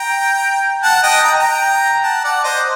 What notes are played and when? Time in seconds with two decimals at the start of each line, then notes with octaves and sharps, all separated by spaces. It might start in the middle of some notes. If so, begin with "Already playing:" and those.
Already playing: G5 A#5
0.83 F#5 A5
1.03 D#5 G5
1.24 A#5
1.39 G5 A#5
2.04 F#5 A5
2.24 D5 F#5
2.44 C5 D#5